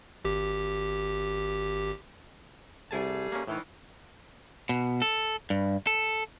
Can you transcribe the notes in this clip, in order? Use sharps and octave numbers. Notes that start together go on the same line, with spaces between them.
G#1 G4
C2 G3 A3 G#4 G#5 A5
A#3 C#4
A2 D#3 E3
B2
A4
G2
A4